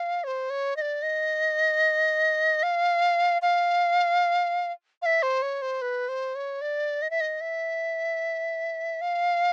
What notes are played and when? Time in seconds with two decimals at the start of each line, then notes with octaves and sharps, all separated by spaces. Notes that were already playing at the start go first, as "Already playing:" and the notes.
Already playing: F5
0.24 C#5
0.27 C5
0.50 C#5
0.77 D#5
0.81 D5
1.02 D#5
2.63 F5
3.42 F5
5.02 F5
5.06 E5
5.23 C5
5.42 C#5
5.62 C5
5.82 B4
6.09 C5
6.35 C#5
6.61 D5
7.02 D#5
7.10 E5
7.21 D#5
7.41 E5
9.01 F5